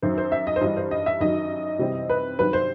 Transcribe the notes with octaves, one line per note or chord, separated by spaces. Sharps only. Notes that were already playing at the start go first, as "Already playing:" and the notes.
F#2 D#3 F#3 C5
C5
E5
D#5
C5
G2 E3 G3 D#5
C5
D#5
E5
F#2 D#3 F#3 D#5
C3 E3 G3 C4
B4
G2 D#3 F#3 C4 B4
C5